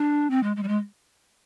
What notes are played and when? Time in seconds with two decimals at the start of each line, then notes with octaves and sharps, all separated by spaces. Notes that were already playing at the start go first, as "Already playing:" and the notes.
Already playing: D4
0.30 C4
0.43 G#3
0.56 G#3
0.63 G3
0.68 G#3